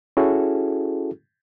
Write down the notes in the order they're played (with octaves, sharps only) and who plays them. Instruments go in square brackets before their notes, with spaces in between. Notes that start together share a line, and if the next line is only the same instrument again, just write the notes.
[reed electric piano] C#4 E4 F#4 G#4 A4